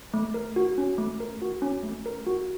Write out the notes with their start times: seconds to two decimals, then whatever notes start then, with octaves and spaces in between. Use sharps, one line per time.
0.14 A3
0.34 A#4
0.56 F#4
0.78 C#4
0.98 A3
1.20 A#4
1.42 F#4
1.62 C#4
1.83 A3
2.06 A#4
2.27 F#4